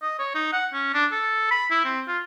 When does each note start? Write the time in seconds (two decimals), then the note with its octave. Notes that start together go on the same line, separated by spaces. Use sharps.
0.02 D#5
0.19 C#5
0.35 D#4
0.53 F#5
0.74 C#4
0.94 D4
1.12 A4
1.51 B5
1.71 E4
1.85 C4
2.08 F4